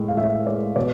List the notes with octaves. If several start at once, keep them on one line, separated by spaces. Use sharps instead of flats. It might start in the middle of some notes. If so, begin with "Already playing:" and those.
Already playing: A2 G#3
F5
A2 E5
G#3 D5
B2 D5